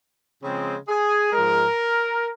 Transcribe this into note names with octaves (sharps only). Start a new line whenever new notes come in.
C#3 F3 G#3 C4
G#4
G#2 F3 G#3 A#4